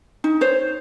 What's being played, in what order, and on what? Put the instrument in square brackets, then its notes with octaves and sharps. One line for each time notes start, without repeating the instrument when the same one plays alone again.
[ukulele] D#4
C5 C#5